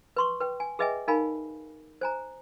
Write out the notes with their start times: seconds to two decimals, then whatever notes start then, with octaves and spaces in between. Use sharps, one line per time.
0.16 B4 C6 C#6
0.40 B4 G5
0.60 G#5
0.79 G#4 B4 D#5 E5 G5 G#5
1.08 D#4 A#4 F5 G#5 B5
2.01 C5 G#5 A#5